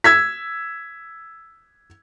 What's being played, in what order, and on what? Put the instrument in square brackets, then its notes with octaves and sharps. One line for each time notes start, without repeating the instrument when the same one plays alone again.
[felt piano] E6 G#6 B6